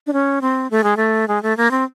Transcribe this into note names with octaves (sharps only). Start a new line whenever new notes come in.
D4
C#4
C4
A3
G#3
A3
G#3
A3
A#3
C4